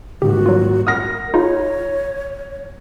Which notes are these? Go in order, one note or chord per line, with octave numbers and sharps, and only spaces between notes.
D#1 G#2 F#4 G4
F#3 F4
A#4 F#5 D#6 F6 A#6
D#4 F4 G#4 C#5